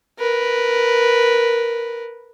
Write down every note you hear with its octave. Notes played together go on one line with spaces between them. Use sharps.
A#4 B4